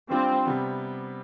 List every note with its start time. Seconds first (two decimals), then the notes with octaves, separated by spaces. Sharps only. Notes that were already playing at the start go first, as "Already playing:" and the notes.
0.11 G3 C4 D4 F4
0.45 C3 G3 B3